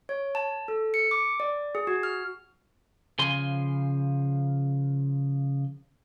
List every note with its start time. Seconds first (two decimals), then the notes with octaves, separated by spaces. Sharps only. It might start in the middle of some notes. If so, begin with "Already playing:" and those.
0.09 C#5
0.35 A5
0.68 A4
0.94 C#7
1.11 D6
1.40 D5
1.75 G#4
1.87 F#4
2.03 F6
3.19 C#3 F3 G#5 C6